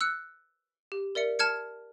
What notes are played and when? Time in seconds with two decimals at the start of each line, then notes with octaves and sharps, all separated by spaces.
0.01 E6 F#6 C#7
0.92 G4
1.15 A#4 D5 E5 C#7
1.39 A5 F6 G#6 C#7